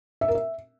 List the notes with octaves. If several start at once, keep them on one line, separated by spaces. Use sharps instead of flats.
E5
A#4
E5